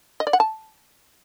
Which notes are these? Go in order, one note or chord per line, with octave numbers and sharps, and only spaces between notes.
D#5
D5
F#5
A5